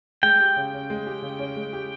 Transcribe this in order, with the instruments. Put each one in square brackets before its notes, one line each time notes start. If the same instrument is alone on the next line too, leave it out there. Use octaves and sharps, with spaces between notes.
[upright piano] G#3 [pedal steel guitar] G5
[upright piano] G4
C#3
C#4
G#3
G4
C#3
C#4
G#3
G4